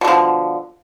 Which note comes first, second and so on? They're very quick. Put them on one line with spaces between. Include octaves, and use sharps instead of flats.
B2 D3 F3